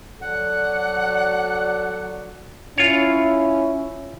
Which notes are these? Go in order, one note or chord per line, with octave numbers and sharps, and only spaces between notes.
F#3 A4 D5 F#5
C#4 E4 F4 C#5